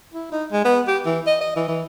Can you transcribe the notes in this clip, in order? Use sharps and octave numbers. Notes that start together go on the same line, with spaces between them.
E4
D#4
G#3
B3
G4
E3
D#5
D#5
E3
E3